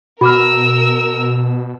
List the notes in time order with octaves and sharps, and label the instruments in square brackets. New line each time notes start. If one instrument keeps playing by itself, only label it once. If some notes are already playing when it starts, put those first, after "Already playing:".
[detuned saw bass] B2 [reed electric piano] F#4 [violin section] A#4 E6 [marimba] B5 D6 F6